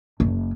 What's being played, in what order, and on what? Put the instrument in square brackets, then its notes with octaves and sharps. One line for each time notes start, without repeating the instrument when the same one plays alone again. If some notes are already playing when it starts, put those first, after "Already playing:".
[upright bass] F#1